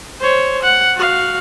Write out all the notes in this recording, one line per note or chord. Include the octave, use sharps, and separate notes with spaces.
C5 C#5
F#5
F#4 F5